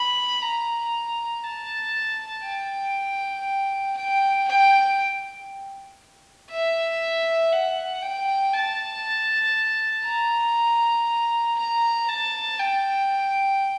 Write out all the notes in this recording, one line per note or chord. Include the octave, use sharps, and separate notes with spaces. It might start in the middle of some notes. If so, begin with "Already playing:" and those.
Already playing: B5
A#5
A5
G5
G5
G5
E5
F#5
G5
A5
A#5
A#5
A5
G5